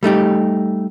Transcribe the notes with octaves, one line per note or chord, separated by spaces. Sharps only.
G3 A3 D#4 G4